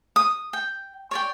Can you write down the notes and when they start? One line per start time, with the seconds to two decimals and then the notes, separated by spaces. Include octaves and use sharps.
0.16 D#6
0.53 G5
1.11 C#5 D5 G5